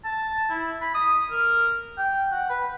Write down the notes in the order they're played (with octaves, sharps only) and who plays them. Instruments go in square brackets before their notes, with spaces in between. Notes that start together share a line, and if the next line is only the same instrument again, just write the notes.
[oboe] A5
E4
B5
D#6
A#4
G5
F#5
B4